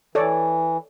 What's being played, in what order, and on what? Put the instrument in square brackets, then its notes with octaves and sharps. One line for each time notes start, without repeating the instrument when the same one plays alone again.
[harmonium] E3 [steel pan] A4 C#5 D5